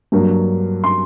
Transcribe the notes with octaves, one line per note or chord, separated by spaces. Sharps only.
G2 F#3 A#3
C6